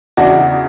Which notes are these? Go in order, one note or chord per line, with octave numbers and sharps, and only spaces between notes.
E2 C#3 E3 D4 F#4